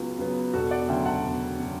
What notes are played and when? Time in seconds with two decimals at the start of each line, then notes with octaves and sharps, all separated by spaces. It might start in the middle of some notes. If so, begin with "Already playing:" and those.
Already playing: C#2 C#3 F#3 B3
0.19 C#3 F#3 B3
0.53 E1 F#4 A4
0.71 D5 F#5
0.89 D2 C#3 F#3 E5 G5
1.06 F#5 A5
1.23 E1
1.59 C#3 F#3